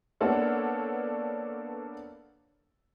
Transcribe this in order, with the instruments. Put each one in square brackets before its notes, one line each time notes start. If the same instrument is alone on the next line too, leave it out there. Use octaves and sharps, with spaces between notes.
[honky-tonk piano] A#3 B3 D4 A4 C#5 F#5